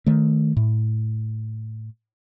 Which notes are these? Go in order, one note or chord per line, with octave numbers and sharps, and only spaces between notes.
D#3 A3
A2